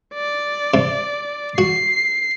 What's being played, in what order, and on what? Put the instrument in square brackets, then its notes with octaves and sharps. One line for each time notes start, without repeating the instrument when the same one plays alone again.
[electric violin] D5
[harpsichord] C3
[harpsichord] F#4 [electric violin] C7